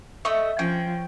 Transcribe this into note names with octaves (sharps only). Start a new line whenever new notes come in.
A3 D#5 E5 C#6
F3 C#4 G5